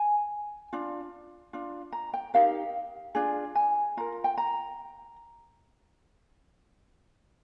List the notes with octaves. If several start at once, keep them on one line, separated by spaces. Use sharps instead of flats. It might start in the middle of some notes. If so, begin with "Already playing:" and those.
Already playing: G#5
D4 F4
D4 F4
A#5
G5
D#4 G4 A#4 F5
D4 F4 G#4
G#5
F4 A#4 A#5
G5
A#5